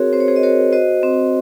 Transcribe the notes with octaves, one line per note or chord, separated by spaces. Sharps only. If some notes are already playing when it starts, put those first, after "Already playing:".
Already playing: C4 F#4 G#4 A#4 C#5
C4 C5
C#5
G#4 C5
D#5
F#4 A#4 C#5
F#4 C5 D#5
C4